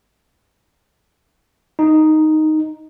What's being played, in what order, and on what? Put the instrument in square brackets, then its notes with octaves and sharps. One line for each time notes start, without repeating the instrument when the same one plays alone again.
[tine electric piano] D#4